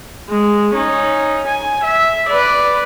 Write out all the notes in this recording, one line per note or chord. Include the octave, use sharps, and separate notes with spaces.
G#3
C#4 D#4
G#5
E5
B4 D5